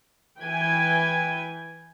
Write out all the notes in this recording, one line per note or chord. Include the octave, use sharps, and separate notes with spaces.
E3 B4 G5 G#5